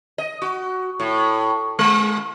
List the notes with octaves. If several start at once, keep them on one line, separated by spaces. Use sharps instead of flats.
D#5
F#4
A2
G#3